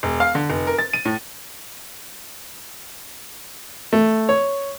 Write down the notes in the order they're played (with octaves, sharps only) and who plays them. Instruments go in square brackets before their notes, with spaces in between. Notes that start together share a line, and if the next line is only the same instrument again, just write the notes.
[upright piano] E1
F5
D3
F1
A#4
A6
D#7
A2
[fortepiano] A3
C#5